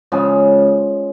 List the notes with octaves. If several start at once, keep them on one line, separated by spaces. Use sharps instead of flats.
C#3 F3 G#3